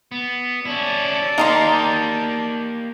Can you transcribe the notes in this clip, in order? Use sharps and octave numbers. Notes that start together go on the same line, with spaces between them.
B3
C#4 E4 D5 A5
A#3 D#4 G4 F5 A#5 C6